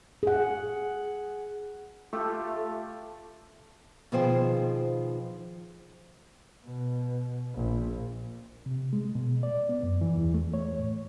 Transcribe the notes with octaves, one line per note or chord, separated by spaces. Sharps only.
G#4 F#5
A3 F4 G4 A4
B2 D#3 F3 G#4 C5 G5
B2
A#1
C3
G#3
B2
D5
B3
F#2
E3
E2
A3
C#5
A2